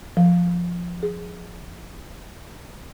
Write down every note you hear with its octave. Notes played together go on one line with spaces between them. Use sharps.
F3
G#4